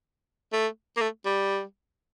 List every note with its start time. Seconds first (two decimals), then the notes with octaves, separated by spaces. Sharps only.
0.53 A3
0.97 A#3
1.01 A3
1.26 G3